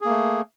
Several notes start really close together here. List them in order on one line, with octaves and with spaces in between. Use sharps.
G#4 A#3 A3